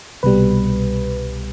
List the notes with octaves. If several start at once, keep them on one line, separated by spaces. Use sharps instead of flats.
C2 B2 G3 B4